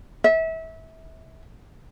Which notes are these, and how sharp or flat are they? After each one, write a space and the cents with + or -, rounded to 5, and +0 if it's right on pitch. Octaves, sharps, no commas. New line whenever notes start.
E5 -30